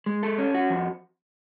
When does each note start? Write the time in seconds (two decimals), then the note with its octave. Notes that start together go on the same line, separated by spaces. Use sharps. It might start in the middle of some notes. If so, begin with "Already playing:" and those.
0.06 G#3
0.23 A4
0.38 C#4
0.54 F#4
0.70 F2